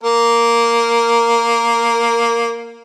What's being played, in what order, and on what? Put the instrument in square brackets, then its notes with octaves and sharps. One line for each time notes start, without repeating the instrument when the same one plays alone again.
[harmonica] A#3 A#4